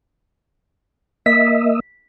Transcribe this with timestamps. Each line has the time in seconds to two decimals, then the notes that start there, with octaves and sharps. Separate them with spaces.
1.26 A#3 D#5 E5 B6